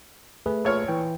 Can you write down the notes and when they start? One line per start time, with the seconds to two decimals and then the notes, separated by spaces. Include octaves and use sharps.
0.46 A3 G#4 B4
0.65 A#1 C#5 F6
0.88 E3 G5